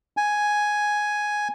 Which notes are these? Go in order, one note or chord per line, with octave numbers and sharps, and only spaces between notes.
G#5